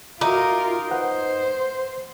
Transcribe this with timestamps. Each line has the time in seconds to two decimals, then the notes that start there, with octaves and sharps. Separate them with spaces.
0.21 D#4 F4 F#4 A#4 E5 D6
0.91 B4 C5 F#5